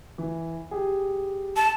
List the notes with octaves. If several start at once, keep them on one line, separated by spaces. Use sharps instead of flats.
E3
G4 G#4
A5